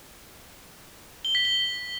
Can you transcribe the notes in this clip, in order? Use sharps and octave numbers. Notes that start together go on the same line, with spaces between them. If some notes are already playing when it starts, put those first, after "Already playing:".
G7
B6
G7